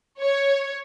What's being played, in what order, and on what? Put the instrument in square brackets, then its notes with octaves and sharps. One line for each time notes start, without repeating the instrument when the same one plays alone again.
[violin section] C#5